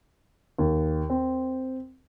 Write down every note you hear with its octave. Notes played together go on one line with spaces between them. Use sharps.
D#2
C4